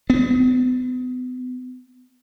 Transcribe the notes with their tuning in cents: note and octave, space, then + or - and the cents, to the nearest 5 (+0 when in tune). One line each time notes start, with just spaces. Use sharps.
B3 +35